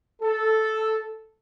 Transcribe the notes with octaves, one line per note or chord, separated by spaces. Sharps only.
A4